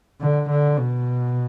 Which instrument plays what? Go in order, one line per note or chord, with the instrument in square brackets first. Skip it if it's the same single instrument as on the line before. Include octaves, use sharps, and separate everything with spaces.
[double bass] D3
D3
B2